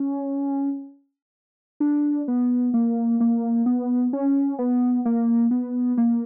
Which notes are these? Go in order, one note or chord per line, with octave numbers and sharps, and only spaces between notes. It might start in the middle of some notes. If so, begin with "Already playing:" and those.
Already playing: C#4
D4
B3
A#3
A#3
B3
C#4
B3
A#3
B3
A#3